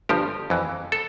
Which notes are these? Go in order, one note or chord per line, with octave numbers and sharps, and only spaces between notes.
G1 G2 F3 G4
F2 E3
A4